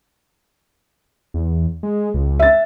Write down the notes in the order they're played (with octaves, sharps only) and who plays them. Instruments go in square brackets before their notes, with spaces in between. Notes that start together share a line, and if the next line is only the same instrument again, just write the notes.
[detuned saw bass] E2
G#3
C#2
[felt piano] E5 A6